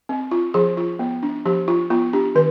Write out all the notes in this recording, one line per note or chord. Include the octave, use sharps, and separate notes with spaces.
C4
F4
F3 G#4
F4
B3
D4
F3 G4
F4
B3 F4
D4 G4
D#3 B4